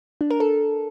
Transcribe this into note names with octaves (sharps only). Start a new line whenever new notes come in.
D4
A#4
A4